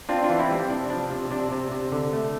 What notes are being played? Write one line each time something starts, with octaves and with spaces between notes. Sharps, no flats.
C4 D4 F4
D4 F4
E3
C4 E4
G3
C4
C3 D4
F3 D4
C3
C3 D4
C3
C3
D3
A3